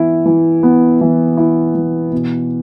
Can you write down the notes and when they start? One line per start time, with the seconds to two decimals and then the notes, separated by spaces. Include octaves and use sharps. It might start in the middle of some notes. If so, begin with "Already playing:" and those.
Already playing: E3 B3 E4
0.26 E3
0.63 B3
1.01 E3
1.37 E4
1.75 E3
2.12 B2